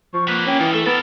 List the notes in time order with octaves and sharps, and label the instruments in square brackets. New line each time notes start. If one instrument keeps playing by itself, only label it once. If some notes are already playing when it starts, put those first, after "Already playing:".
[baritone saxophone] F3 [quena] C#6
[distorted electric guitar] A#3 B4 [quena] F#6
[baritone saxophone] C#4 [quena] G5
[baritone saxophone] E3 [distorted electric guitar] D#4 F4
[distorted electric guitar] A3 [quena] A4
[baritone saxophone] B3 [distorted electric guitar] A4 A#4 [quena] B5